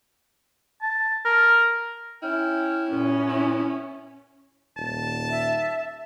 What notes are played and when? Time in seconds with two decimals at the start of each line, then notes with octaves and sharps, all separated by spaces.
0.82 A5
1.25 A#4
2.22 C#4 E4 G5 F6
2.91 F#2 A#2 B3 C#4
3.29 E4
4.77 D#1 A5
5.30 E5